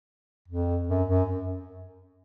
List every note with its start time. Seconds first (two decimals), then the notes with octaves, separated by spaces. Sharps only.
0.48 F2
0.89 F#2
1.09 F#2